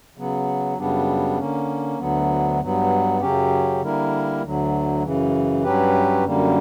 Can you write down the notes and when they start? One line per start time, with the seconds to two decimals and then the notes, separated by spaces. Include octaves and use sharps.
0.17 C#3 F#3 B3
0.77 F#2 C#3 G3 B3 D4
1.38 D3 A#3 C#4
1.99 D2 D3 F#3 B3
2.60 G2 F#3 B3
3.21 F#2 C#3 F#3 C#4 G4
3.81 D3 G3 A#3 E4 A#4
4.42 D2 D3 F#3
5.03 F#2 C#3 E3
5.63 G2 F#3 C#4 G4 B4
6.25 F#2 D3 G3 A#3